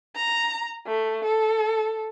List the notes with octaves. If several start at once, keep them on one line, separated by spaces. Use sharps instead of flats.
A#5
A3
A4